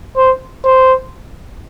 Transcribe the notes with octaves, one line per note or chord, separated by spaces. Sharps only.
C5
C5